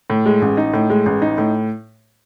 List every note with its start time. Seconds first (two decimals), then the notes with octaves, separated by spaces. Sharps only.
0.10 A2
0.26 G#3
0.42 A1
0.57 D#4
0.73 A2
0.90 G#3
1.06 A1
1.22 D#4
1.38 A2